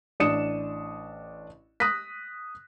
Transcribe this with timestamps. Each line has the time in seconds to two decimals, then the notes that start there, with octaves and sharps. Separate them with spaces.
0.20 A1 D4 D#6 C#7 E7
1.80 D#6 F#6 A#6 B6